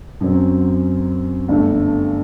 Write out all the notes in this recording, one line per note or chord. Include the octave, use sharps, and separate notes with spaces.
F#2 F#3 C4
G1 G2 D3 A3